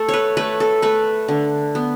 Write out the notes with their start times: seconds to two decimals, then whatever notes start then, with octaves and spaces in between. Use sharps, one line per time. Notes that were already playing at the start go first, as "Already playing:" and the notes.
Already playing: A3 A4
0.09 B4 C#5
0.37 A3 B4
0.60 A4
0.82 A3 B4
1.28 D3
1.75 B3